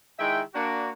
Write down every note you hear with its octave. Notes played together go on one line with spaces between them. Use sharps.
D#3 G#3 E4 E5 G5
A#3 D4 F#4